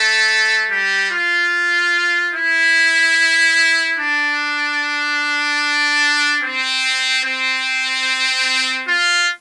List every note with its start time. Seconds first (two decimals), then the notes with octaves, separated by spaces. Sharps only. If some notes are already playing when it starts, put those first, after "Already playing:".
Already playing: A3 A4
0.71 G3 G4
1.11 F4
2.33 E4
3.98 D4
6.42 C4
7.24 C4
8.87 F4